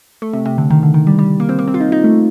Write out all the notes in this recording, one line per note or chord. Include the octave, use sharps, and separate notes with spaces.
A3
C3
C3
D3
D#3
D3
D#3
G3
G3
A#3
C4
A#3
C4
F4
D#4
D#4
A3